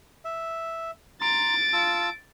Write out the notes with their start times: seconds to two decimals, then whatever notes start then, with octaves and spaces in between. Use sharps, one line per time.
0.25 E5
1.21 A#5 C6 A6 D7
1.73 F4 A5 E6